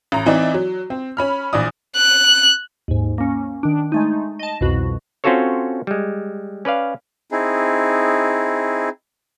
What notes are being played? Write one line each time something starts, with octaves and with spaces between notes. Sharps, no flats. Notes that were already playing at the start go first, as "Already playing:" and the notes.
A1 A#5
E3 C4 D#4 E4 D5
F#3
C4
C#4 B5 F6
A#1 E3 D5 D#6
F#6
D#2 G#2
A#3 C#4
D#3 D4
G#3 A3 D#4
D#5 A5
C2 F2 B2 F#4
C4 C#4 F4 F#4 A4 C#5
G3 G#3
C#4 B4 D5 F5
C4 D#4 E4 G#4